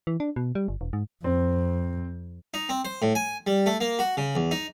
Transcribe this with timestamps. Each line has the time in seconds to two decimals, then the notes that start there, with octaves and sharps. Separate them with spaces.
0.07 E3
0.20 D4
0.36 B2
0.55 G3
0.68 G1
0.81 E1
0.93 G#2
1.24 F2 C4
2.54 D#4
2.69 C4
2.85 C5
3.02 A2
3.15 G#5
3.47 G3
3.66 A3
3.81 A#3
3.99 F#4
4.17 C#3
4.35 E2
4.51 D#4